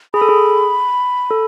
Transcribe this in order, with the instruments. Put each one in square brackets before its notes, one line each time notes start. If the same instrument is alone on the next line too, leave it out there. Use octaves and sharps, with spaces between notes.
[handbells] G#4 [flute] B5
[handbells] A4
G#4
A4